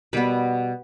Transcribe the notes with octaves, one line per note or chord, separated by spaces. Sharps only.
B2 G3 B3 B4